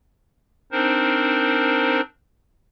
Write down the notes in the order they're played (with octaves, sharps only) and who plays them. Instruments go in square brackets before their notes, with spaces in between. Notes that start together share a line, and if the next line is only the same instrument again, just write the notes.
[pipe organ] C4 D4 D#4 A#4 C5